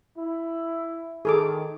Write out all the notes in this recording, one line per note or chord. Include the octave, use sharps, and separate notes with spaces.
E4
D#3 G#4 A4 D6